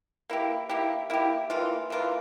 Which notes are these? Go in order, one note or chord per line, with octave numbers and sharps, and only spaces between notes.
A#3 E4 G4
A#3 E4 G4
A#3 E4 G4
E3 A#3 F4
E3 A#3 F4